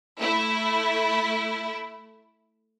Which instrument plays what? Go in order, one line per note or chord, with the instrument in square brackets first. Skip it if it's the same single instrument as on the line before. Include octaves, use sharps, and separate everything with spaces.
[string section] A3 E4